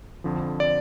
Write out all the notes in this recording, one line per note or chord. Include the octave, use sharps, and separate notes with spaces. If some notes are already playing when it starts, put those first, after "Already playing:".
F2 D3 F3
D5